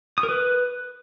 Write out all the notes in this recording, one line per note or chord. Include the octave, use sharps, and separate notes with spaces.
D#6
A#4
B4